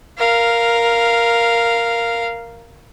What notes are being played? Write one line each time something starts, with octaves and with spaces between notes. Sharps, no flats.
A#4 F5